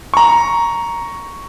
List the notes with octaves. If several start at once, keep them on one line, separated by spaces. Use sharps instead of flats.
A#5 C#6